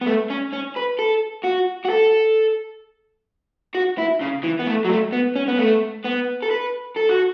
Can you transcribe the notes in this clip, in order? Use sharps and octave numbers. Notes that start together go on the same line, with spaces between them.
B3
A3
C#4
C#4
B4
A4
F#4
F#4
A4
F#4
E4
C#3
E3
B3
A3
F#3
A3
B3
C#4
B3
A3
B3
A4
B4
A4
F#4